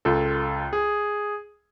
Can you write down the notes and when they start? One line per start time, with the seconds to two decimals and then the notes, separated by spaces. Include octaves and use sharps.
0.05 C#2 F4 A4
0.73 G#4